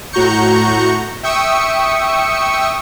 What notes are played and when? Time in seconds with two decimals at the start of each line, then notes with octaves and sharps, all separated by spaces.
0.12 A2 F#4 A#5 C#6 G6 C#7
1.23 E5 G5 C#6 D#6 E6 C#7